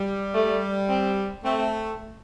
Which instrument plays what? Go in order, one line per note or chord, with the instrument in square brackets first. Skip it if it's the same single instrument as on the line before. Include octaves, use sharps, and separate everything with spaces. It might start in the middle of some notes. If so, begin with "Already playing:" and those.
Already playing: [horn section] G3
[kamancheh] A3
C4
[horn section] A3 [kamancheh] C4